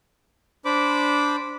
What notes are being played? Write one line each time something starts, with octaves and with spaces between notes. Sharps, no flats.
D4 C5 B5 D6